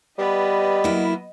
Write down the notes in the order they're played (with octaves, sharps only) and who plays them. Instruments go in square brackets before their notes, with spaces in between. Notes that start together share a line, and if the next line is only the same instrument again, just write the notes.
[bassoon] G3 [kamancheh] B3 B4 [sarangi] D#5
[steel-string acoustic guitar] F#3 A#3 E4